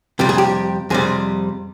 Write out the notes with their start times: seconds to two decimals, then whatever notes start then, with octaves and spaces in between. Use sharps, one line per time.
0.19 F2 C3 G3 G4
0.29 G#4
0.38 G4
0.90 F2 C3 G3 G#4